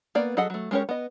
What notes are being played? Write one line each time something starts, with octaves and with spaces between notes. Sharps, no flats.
A#3 B3 D5
F#3 G#4 A4 D#5 F#5
F#3 A3
G#3 C#4 G4 A#4 C#5
B3 D#5